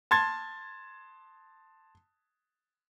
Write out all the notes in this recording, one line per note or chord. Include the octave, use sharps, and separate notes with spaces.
A5 C6 G#6 A6